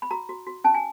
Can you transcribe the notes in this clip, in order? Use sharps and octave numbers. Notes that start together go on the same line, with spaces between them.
B5
F#4 A#5
F#4
F#4
C#4 A5
G#5